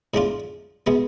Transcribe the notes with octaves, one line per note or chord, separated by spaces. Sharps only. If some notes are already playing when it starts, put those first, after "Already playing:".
A2 G#3 D4 F4
B2 G#3 B3